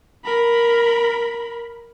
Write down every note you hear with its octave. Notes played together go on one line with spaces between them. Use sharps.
A#4 B5